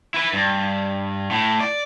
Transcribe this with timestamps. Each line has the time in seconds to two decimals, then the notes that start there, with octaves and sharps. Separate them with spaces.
0.14 E4 B4
0.33 G2
1.31 A2
1.60 D5